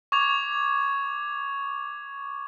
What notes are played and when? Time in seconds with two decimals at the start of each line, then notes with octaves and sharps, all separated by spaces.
0.12 C#6 D6 G#6 F7